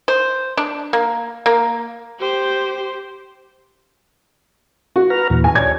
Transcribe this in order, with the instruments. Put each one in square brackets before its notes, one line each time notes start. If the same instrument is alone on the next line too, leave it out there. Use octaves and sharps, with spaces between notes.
[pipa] C5
D4
A#3
A#3
[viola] G4 C5
[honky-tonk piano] F#4
[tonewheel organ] B4 A#5 F6
D#2 A#2 E3
[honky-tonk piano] G#5
[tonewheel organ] C#5 D5 [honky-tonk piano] G#6